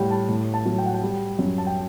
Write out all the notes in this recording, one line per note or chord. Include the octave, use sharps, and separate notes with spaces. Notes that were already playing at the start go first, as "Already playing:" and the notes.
Already playing: A2 G3 F#5 G5
A5
A2
A5
F#3
G5
F#5
G5
G3
F#2
A5
G5